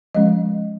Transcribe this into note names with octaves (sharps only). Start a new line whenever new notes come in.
F3 G#3 C#4 D#5